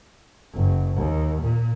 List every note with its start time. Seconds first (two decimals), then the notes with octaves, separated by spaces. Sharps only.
0.54 F#1
0.96 D#2
1.42 A#2